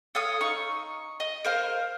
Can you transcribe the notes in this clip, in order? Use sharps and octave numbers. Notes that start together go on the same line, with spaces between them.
A4 C#5 F5 D#6
D#4 C#6
D#5
A#4 C5 F5